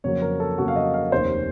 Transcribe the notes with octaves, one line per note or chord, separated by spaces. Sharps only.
F2 C#3 F#3 A#3 C#5
A#4
A4
F2 C#3 F#3 A#3 F#4
F5
D#5
F5
F1 D#2 D#3 A#3 C#4 C5